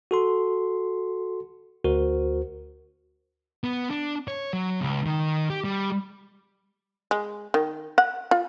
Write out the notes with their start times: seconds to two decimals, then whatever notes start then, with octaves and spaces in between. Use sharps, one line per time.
0.11 F#4 A4 C6
1.84 D2 F#4 A#4 C5
3.64 B3
3.91 D4
4.28 C#5
4.53 F#3
4.81 C#2
5.06 D#3
5.50 G4
5.64 G3
7.11 G#3
7.54 D#3
7.98 F#5
8.31 F4